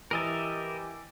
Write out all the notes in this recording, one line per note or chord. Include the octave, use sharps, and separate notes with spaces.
E3 G4 A#4 D#5 E5 E6 A6